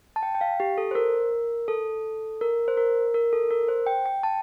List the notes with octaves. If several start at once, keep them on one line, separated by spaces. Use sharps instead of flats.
A5
G5
G5
F5
G4
A4
C5
A#4
A4
A#4
C5
A#4
A#4
A4
A#4
C5
G5
G5
A5